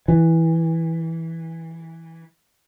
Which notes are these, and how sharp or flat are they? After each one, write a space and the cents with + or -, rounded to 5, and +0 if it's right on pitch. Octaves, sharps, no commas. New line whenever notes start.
E3 -10